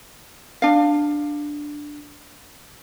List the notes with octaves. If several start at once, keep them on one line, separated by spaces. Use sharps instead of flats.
D4 F5